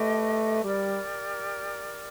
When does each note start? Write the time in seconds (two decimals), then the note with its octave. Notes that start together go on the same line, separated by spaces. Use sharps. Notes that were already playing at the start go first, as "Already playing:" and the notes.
Already playing: A3 G4 B4 D#5
0.63 G3 G4 A#4 D5